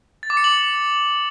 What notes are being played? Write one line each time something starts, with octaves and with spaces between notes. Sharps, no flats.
A6
D6
C#7
F#7